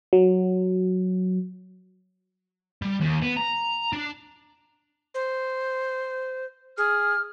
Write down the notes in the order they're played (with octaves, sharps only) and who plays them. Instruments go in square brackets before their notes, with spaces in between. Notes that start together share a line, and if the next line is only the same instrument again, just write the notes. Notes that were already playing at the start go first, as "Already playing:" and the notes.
[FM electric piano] F#3
[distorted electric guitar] G3
D#2
B3
A#5
D4
[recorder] C5
[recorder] G#4 [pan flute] F6